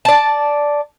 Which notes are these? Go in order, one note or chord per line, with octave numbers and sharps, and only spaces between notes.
D5 A5